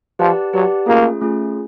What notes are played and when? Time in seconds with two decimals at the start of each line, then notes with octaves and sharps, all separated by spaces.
0.19 F3 G4 B4 D5 F#5 A5
0.53 F#3 G4 B4 D5 F#5 A5
0.87 A3 A#3 C#4 F4 G#4
1.21 A3 C#4 F4 G#4